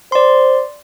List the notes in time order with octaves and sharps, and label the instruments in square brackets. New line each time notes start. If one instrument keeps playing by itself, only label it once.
[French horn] C5 [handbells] D5 C6